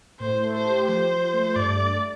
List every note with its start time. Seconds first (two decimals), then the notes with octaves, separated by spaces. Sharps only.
0.20 A2 C5
0.43 A3
0.53 C5
0.65 G4
0.88 F3 C5
1.10 F3
1.33 A3
1.56 G2 D5
1.79 A3